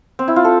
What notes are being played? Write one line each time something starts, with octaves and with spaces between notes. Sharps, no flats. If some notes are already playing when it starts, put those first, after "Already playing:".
C4
E4
F4
A4